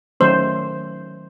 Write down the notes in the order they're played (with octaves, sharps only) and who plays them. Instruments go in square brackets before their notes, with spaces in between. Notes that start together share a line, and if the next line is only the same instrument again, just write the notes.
[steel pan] D#3 F#3 A3 C#4 C5